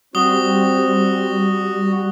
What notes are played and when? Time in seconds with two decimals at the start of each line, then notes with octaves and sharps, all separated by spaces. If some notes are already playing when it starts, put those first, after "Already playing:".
0.15 G3 C4 F#4 D#6 G7